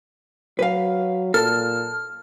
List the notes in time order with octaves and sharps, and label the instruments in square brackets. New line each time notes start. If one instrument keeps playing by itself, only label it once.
[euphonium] F#3 [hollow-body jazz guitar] B4 F5
[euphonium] A#2 [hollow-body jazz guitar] A4 [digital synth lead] F6